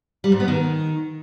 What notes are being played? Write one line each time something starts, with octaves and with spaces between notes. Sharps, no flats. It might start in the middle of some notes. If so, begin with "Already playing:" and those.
G3
G#2
B3
D#3